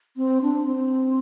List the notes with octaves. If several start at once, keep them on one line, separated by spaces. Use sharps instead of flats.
C4
D4
C4